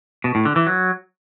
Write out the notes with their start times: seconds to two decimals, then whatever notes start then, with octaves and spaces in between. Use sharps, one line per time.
0.24 B2
0.35 A2
0.45 D3
0.56 E3
0.67 F#3